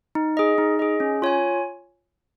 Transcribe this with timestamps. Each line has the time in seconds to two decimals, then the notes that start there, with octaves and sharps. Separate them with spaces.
0.15 D#4
0.37 G#4 D#5
0.58 D#4
0.79 G#4 D#5
1.00 C#4
1.22 F4 C#5 G#5